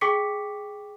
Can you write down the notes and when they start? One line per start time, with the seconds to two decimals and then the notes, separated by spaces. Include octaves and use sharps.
0.01 G#4 G5 C#6 D6 B6 C#7